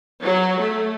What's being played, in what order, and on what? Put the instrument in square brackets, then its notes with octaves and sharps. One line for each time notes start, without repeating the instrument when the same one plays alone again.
[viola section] F#3
A3